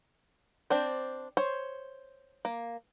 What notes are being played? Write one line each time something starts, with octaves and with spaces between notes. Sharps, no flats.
C4 D4 C5
C5 C#5
A#3